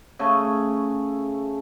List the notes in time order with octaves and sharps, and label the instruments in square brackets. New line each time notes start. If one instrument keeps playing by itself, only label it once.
[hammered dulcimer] C#3 A3 G#4 A4